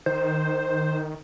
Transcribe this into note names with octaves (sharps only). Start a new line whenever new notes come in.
D#3 C5